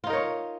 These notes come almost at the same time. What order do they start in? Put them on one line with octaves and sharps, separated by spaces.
F4 D#4 A#4 C#5